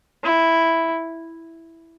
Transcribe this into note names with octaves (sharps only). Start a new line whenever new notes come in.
E4